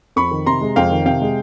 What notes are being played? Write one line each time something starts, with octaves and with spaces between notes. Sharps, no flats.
F2 B5 C#6
D#3
C3 A#5 C6
G#3
F2 F5 G5
D#3
C3 F5 G5
G#3